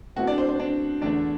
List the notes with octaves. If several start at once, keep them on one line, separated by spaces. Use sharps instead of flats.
B2 A3 C4 E4 F#4 F#5
D4 D5
C5
C5
D4 D5
E2 D3 A3 D4 D5